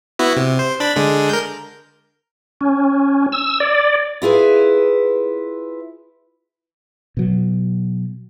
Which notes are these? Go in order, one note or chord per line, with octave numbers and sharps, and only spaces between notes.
B3 E4 F#4
C3
C5
D4 D5 B5
D3 G#3 D4
A#4 G6
C#4
E6
D5
E4 F4 G#4 B4
B2 F#3